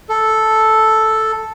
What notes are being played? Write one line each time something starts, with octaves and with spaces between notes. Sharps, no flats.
A4